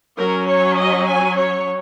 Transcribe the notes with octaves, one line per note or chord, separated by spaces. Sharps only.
F#3 C#4 A#4
C#5
D#5
G#5
C#5